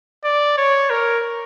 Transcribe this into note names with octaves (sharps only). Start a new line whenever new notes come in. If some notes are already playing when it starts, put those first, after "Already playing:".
D5
C#5
A#4